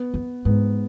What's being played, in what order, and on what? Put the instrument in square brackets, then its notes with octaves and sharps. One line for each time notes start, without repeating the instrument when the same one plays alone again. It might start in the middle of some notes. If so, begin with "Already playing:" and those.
Already playing: [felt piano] B3
[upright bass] F#2
[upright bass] G#2 [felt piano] B3